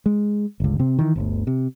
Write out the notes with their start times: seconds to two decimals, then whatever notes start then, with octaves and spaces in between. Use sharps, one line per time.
0.06 G#3
0.60 G1 C#2
0.79 C3 C4
0.99 D#3 E3
1.16 G1 D2
1.47 C3